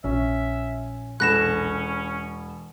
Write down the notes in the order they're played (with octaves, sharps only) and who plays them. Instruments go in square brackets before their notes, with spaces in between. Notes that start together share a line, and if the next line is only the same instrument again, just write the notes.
[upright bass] A#1 [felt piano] C#4 [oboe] E5
[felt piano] E1 A4 B5 [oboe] C#4 [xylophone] F#6 A#6 E7